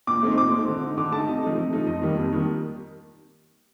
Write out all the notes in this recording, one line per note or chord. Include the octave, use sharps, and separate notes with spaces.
A#2 D6
A3 C4 D#4
C6
A#2 D6
A3 C4 D#4
D3
A3 D#4
D3 D6
A3 D#4 A5
C3 D#5
F3 A3 D#4
C3
F3 A3 D#4
F2 D#5
D#3 G3 A#3
F2
D#3 G3 A#3